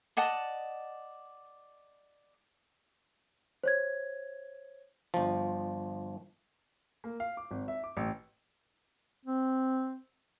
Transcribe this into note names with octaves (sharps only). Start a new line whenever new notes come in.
D5 D#5 F#5 A5
C5 C#5 G#6
G1 F3
A#3
F5
D6
G#1
E5
D6
A1
C4